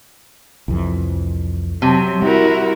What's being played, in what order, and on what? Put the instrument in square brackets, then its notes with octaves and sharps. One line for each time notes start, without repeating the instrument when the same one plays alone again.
[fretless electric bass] C2 F2 E3
[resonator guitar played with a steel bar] C3 [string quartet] F#3
[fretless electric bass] G3 [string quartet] E4 F#4 A#4